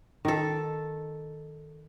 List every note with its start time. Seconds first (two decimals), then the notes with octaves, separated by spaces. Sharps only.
0.25 D#3 A4